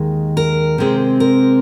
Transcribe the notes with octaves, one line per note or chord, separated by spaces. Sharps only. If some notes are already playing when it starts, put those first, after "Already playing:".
Already playing: D#2 D#3 G#3
A#4
C3 G#3 C4
A#4